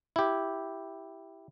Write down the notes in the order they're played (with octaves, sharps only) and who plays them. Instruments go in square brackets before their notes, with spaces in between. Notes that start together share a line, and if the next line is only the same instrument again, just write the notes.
[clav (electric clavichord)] E4 G4